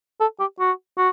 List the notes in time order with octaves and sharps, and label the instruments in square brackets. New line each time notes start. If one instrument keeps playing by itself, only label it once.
[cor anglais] A4
G4
F#4
F#4